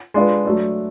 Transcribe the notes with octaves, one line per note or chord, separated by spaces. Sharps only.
G#3 D4 F4 B4
F#3 A3 D4